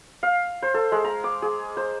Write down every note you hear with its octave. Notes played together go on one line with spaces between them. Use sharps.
F5
C5
A4
G#3
A#5
D6
G#4
C5